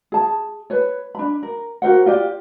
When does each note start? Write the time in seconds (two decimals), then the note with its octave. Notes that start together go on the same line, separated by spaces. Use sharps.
0.12 G#4 A5
0.70 B4 C#5
1.15 D4 B5
1.43 A#4
1.82 F#4 A#4 C5 F#5
2.06 F4 G4 D5